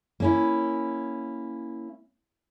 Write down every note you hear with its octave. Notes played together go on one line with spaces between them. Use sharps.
A#3 C#4 E4